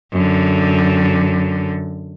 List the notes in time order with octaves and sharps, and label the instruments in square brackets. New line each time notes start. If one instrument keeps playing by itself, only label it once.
[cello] F#2 D3